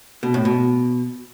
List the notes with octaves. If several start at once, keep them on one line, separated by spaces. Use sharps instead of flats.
B2
A2
B2